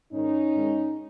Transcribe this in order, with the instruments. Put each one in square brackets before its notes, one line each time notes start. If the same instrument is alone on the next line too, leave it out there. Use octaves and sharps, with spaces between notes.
[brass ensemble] G#2 D#3 C#4 D#4
G#2 D#3